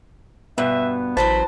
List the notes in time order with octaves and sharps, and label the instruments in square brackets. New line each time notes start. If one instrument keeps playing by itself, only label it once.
[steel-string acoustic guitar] G2 B2 [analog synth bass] B3 [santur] B4 [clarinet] E5
[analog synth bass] A1 [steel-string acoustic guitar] E2 F#3 C5 [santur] A5 [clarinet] B5